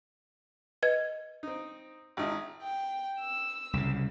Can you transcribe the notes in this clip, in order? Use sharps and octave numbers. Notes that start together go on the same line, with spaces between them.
B4 D#5 G#6
C4 D#4
G#1 D#4 E4
G5
E6
C2 C#3